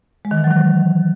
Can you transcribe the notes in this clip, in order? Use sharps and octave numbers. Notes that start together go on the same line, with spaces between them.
G#3
D#3
E3
F#3
D#3